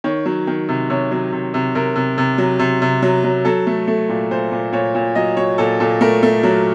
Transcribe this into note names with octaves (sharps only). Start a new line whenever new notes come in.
D#3 C#5
F#3
D#3
C3
C3 C#5
F#3
C3
C3
C3 A#4
C3
C3
F#3
C3
C3
F#3
F#3
F#3 A4
A3
A3
A#2
A#2 C5
A#2
A#2 C#5
A#2
F#3 D#5
F#3 C#5
A#2 A4
A#2 A4
A3 A#4
A3
F#3